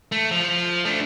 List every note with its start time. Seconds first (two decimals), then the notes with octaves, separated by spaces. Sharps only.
0.12 A3
0.31 F3
0.85 A3 D4